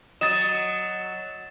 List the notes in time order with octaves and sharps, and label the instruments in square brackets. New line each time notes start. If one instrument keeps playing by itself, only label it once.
[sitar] F#3 D#5 [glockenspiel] A6 E7